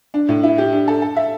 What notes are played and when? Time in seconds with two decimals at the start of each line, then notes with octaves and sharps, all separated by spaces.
0.14 D4
0.29 A2
0.43 E4
0.58 G4
0.73 D4
0.88 A4
1.02 A4
1.16 E5